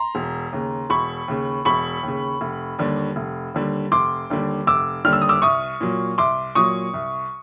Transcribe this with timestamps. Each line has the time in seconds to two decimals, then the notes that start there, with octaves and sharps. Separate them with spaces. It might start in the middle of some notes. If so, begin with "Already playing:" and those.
Already playing: A#5 C6
0.15 E1
0.53 D#2 C#3
0.90 E1 B5 C#6
1.28 D#2 C#3
1.65 E1 B5 C#6
2.03 D#2
2.08 C#3
2.41 F1
2.79 D#2 D3 G3
3.16 F1
3.54 D#2 D3 G3
3.92 F1 C6 D6
4.30 D#2 D3 G3
4.67 F1 D6 E6
5.05 D#2 D3 G3 F6
5.13 E6
5.22 D#6
5.29 D6 E6
5.42 C2 C#6 D#6
5.81 A#2 F#3
6.18 C2 C6 D6
6.55 A#2 F#3 C#6 D#6
6.94 C2